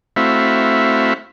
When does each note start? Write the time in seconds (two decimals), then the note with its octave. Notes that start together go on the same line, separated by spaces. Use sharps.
0.16 A3 C4 E4 F#4 E5 F5